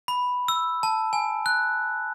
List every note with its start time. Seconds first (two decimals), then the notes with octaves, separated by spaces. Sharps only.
0.08 B5
0.48 E6
0.83 A5
1.13 G#5
1.46 F#6